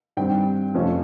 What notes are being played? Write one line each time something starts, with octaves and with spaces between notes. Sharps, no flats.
G2 D#3 G3 C4 G5
F2 C3 F3 A3 C#4